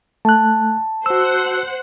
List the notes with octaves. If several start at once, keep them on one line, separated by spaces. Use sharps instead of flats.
A3 A5 F#6
F#4 C5 F#5 E6